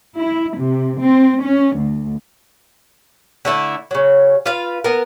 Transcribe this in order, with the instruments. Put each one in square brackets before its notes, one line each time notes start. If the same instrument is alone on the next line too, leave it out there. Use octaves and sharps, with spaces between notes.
[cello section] E4
C3
C4
C#4
D2
[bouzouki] D3 A3 E4
C#3 F#3
F4 B4 F5
B3 A#4